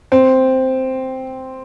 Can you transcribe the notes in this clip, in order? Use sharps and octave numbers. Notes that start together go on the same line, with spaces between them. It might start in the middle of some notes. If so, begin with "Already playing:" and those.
C4